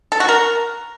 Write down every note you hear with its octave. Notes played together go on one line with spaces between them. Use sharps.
A4
F#4
A#4